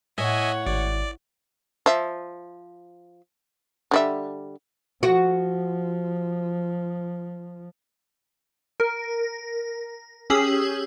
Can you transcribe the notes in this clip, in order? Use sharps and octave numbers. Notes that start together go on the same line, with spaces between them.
A2 C#5 D#5 E5 F#5 G#5
G#1 D5
F3 E5
D3 G3 E5
F3 F#4
A#4
C#4 G4 G#4 D#6 E6 F#7